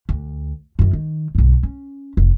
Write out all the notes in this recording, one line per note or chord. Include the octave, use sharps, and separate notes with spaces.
D2
F#2 E3
D#3
B1 G2
C#4
F1